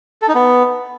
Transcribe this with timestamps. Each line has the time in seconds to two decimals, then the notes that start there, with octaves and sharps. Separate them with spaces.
0.22 A4
0.28 D#4
0.35 B3